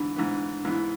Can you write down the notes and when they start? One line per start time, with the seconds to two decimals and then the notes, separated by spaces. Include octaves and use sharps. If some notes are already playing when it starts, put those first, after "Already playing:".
Already playing: G#2 E3 B3 D4
0.16 G#2 E3 B3
0.65 G#2 E3 B3 E4